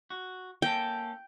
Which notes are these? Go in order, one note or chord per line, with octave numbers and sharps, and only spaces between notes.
F#4
A#3 C#4 A4 G5